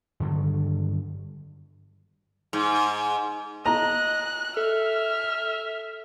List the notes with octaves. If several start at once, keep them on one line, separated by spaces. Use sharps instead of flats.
G2 D3 D#3 F#3
G#2
D#5 A#5 F#6
A4 E5 F6